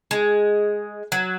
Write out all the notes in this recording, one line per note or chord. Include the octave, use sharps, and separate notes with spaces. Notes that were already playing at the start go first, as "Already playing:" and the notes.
G#3
F#3